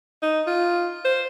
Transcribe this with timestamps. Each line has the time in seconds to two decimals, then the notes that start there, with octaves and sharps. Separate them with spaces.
0.23 D#4
0.47 F4
1.05 C5